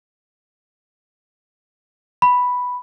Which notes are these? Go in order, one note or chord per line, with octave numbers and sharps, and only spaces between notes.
B5